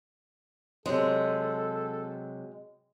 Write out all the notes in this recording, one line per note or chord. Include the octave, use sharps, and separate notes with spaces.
C3 F#3 G#3 A4